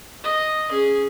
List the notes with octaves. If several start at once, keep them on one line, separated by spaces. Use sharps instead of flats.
D#5
C#4 G#4